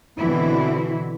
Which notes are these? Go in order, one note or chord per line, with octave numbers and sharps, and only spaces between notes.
B2 D3 E3 C4 E4